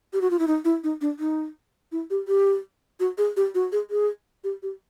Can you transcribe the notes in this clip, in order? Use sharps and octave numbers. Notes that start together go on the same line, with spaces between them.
G4
F#4
F4
E4
D#4
E4
D#4
D4
D#4
E4
G4
G4
F#4
G#4
G4
F#4
G#4
G#4
G4
G4